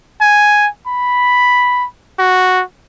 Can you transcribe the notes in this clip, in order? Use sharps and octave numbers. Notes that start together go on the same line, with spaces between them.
G#5
B5
F#4